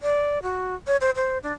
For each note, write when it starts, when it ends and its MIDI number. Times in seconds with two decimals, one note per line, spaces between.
0.02 0.42 74
0.43 0.75 66
0.87 0.97 73
1.01 1.11 72
1.16 1.38 72
1.43 1.53 62